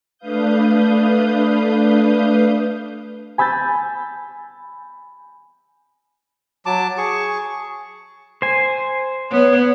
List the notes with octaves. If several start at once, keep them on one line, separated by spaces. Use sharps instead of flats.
A3 D4 B4 F5 D#6 G6
G#5 B5 E6 G6 A6
F#3 A5 D6
G#4 C#6
C5 G#5
B3 C#5